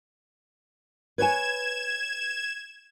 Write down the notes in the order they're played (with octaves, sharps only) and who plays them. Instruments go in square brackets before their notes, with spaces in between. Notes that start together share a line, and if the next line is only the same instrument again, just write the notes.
[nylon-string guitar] B4 C#5 G#5 [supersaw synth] G#6 E7